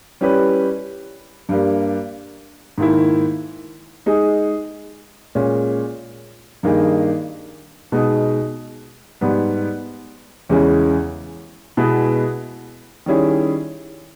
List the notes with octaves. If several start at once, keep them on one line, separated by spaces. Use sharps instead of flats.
G3 C#4 E4 G4 B4
G2 G3 A#3
G#2 D#3 A#3 E4
G#3 D#4 G#4
A#2 G#3 C#4
G2 D#3 A#3 D#4 G#4
B2 G#3 D#4
G#2 G3 B3
E2 C#3 G#3 C#4 E4
B2 G#3 B3 E4 G#4
D#3 G3 C#4 E4 G#4